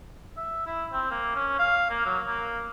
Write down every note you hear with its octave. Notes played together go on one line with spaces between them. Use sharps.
E5
E4
C4
A#3
C#4
F5
A#3
F#3
A#3